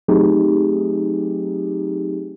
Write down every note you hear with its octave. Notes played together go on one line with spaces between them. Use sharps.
F#3 A3 C4 D#4 G4 G#4